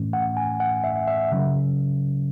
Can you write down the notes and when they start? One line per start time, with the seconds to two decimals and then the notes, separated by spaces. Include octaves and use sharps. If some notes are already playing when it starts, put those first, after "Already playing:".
Already playing: A2 E3 A3 C#4
0.13 F#5
0.37 G#5
0.60 F#5
0.84 E5
1.08 E5
1.32 C#3 F#3 C#4